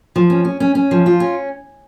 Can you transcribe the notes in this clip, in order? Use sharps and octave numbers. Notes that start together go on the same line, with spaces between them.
F3
C#4
C#4
C#4
C#4
F3
F4
C#4